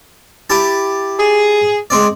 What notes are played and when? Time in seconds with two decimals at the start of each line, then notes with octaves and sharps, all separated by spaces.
0.50 E4 G4 A5
1.17 G#4
1.90 G#3 C4 D5